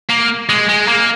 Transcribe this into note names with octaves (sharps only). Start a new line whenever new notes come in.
A#3
G#3
G#3
A#3